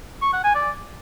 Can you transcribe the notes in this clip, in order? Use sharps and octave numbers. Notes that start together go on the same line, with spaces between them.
C#6
F#5
G#5
D5